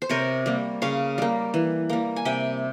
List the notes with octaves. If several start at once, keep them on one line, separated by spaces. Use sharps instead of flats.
C5
C3 A#4 C#5
G3 A#3
C#3 C#5 F5
G3 A#3
E3
G3 A#3
G#5
C3 E5 G5